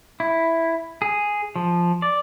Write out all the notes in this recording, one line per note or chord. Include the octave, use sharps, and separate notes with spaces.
E4
G#4
F3
D5